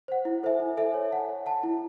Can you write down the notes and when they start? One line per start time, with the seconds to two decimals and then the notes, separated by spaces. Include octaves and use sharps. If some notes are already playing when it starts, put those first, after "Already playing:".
0.08 C5 F#5
0.25 E4
0.43 A4 C5 E5 G#5
0.60 E4
0.77 A4 C5 E5 G#5
0.94 C#5
1.11 F#5 A5
1.29 C#5
1.46 F#5 A5
1.63 E4